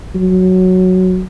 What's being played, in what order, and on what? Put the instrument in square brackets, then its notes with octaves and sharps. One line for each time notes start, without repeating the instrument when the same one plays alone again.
[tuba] F#3